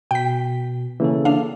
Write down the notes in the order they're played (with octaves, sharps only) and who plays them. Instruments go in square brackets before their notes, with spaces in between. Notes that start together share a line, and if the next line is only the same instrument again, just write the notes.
[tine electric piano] B2 [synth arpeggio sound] G5 B6
[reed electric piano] C#3 E3 [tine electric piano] A#3 A4
[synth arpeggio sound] D4 F5